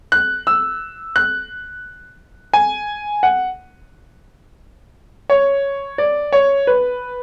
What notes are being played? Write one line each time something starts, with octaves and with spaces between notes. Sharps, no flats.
F#6
E6
F#6
G#5
F#5
C#5
D5
C#5
B4